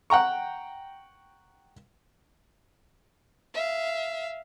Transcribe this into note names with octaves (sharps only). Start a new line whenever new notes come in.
F#5 G5 A#5 C#6
E5 F5